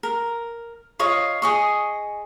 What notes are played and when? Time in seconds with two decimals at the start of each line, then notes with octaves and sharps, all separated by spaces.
0.03 A#4
0.99 F4 C#5 D#5 F5
1.42 G#4 D#5 C#6